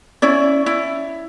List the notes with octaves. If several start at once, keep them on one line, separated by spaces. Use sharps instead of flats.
C#4 E4 D5
E4